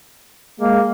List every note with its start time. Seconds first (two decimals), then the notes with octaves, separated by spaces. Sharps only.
0.60 G#3 A#3